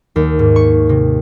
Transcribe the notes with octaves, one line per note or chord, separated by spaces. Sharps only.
D#2
G#2
C#6
C3